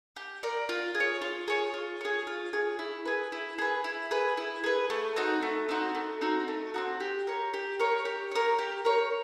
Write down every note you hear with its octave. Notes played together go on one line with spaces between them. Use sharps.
G4
A#4 D5
F4
G#4
C#5
F4
G#4 C#5
F4
G#4 C#5
F4
G#4 C#5
E4
G#4 B4
E4
G#4 B4
E4
G#4 B4
E4
G#4 B4
A3
C4 D#4 F#4
A3
C4 D#4 F#4
A3
C4 D#4 F#4
A3
C4 D#4 F#4
G4
A#4 C#5
G4
A#4 C#5
G4
A#4 C#5
G4
A#4 C#5